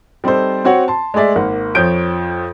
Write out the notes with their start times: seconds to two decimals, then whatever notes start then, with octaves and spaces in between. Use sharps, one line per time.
0.24 G3 C4 D#4 A4 C5
0.65 C4 F#4 C#5 F#5
0.88 A5 C6
1.14 G#3 A3 G#4 D5 E5
1.35 G#1 A#3 F#5
1.75 F2 F3 C#5 G6 D7